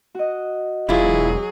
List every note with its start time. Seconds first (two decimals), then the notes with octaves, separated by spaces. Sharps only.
0.15 F#4 D#5
0.89 E1 F#3 E4 F4 G#4